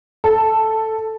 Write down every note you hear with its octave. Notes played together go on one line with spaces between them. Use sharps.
A4